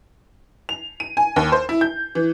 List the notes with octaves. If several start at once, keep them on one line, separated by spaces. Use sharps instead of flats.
F7
D#7
G#5
D#2
C5
E4
G6
E3